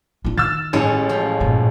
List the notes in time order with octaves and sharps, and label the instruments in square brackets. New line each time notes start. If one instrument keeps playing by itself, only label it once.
[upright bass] D4 F4
[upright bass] D#3 [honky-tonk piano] E6 F6 A6
[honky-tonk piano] A1 [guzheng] G#3 C#4 A4
[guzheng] F3
[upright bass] G2 A#2